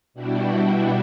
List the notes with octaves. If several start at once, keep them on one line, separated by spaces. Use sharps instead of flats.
B2 G3 D4 E4 F#4 G4